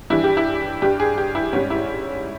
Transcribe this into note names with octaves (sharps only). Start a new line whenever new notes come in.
G2 E3 G3 E4
G4
E4
G2 G3 G4
G#4
G4
E4
G#2 G3 C#4
E4